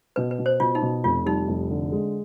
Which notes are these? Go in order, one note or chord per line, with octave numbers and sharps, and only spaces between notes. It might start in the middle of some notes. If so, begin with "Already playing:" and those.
B2 B4
B4
B2
C5
B2 F4
D#4
B2
F1 F4
G3 D#4
F1
D3
G#3